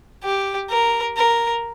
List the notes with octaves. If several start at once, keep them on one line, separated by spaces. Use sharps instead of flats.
G4
A#4
A#4